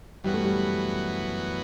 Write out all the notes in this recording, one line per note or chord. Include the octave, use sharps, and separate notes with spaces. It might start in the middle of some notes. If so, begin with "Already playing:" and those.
F#2 E3 G3 B3 F#4
A3
G3